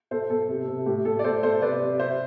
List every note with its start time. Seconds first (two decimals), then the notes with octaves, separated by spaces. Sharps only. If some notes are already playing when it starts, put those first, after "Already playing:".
0.11 B2 A4 C5
0.30 B2 A4
0.49 C3
0.68 C3
0.86 A2 G4
1.05 A2 A4
1.19 D5
1.24 B2 A4 C5
1.43 B2 A4 C5
1.62 C3 B4 D5
1.81 C3
1.99 C3 C5 E5